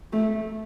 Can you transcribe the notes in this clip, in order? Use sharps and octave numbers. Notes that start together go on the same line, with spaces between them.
A3